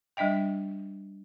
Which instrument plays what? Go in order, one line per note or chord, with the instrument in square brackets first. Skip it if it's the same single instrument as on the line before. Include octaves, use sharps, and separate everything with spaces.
[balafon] G3 D4 D#5 E5 G5